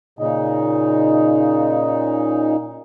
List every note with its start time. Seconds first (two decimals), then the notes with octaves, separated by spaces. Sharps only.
0.19 A#2 C#3 D#4